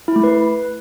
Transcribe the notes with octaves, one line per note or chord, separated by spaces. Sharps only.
E4
A3
B4